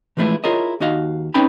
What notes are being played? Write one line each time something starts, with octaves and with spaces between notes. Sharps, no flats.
E3 F3 G#3 A3 E4 B4
E4 F4 G#4 A#4 C#5 D#5
D#2 D#4 F#4 D#5 F5
C4 C#4 D#4 B4 G5 B5